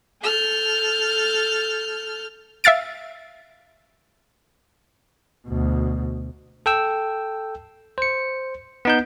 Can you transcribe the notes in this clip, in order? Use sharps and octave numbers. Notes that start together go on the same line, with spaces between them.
A4 F6 G6
E5 F5 F6 A6 D7
D2 B2
A4 G5 E6
C5 C#7
B3 D#4 G6